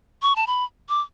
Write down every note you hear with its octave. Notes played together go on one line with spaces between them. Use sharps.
C#6
A5
B5
D6